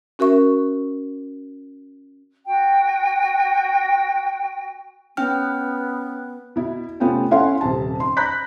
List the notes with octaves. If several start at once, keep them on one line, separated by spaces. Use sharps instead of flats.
C#4 F#4 A#4 E5 C#6
F#4 G5
B3 C#4 G5 F6
B2 E4
C3 A3 B3 C#4 F4 G5
C#4 E4 A4 F5 F#5 C6
D#1 C3 A5
C6
A#5 B5 F#6 G6 B6